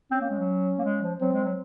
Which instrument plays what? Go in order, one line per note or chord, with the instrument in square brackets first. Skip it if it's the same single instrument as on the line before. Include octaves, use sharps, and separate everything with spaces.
[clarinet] C4 [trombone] C#4
[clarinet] A#3
G#3
F#3
A#3
G#3
F3
[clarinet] F#3 [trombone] C4
[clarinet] G#3
F#3